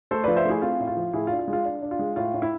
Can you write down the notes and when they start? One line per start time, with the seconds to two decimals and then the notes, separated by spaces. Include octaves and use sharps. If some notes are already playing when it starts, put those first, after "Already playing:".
0.11 A3 A4 C5
0.24 F3 B4 D5
0.36 C5 E5
0.45 A3 E4 G#4
0.62 C4 F4
0.80 A2
0.87 F4
0.97 F3
1.13 A2 E4 G#4
1.27 F4
1.31 D4
1.39 F4
1.48 G#3
1.53 F4
1.65 D4
1.82 D4
1.91 F4
1.99 G#3
2.16 A2 F4
2.34 A2
2.42 E4